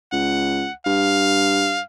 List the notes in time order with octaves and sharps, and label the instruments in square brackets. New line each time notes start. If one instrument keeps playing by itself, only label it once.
[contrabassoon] C#2 [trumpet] F#5
[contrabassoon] G2 [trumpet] F5